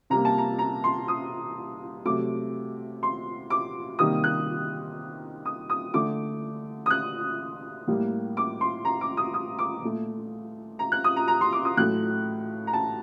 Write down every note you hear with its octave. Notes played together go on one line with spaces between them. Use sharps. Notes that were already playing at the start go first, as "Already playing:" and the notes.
C3 G3 A#3 A#5
A5
A#5
A#5
C6
D#6
C3 F#3 A3 D6
C6
D6
C3 D#3 G3 A#3 D#6
F#6
D#6
D#6
D3 A3 D6
D#6
F#6
A2 G3 A#3
D6
C6
A#5
D6
D#6
D#6
D6
A#2 A3
A#5
F#6
D#6
A#5
A#5
C6
D6
D#6
A2 F#3 A3 F#6
A#5
A5